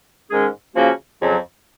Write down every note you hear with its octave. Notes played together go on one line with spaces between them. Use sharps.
G#2 D#3 G#3 C#4 G#4
C#3 F3 A#3 C#4 F#4
F2 C#3 F#3